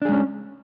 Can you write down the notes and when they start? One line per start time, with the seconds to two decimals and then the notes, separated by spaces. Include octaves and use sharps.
0.02 D4
0.05 G#4
0.09 G#3
0.12 C#4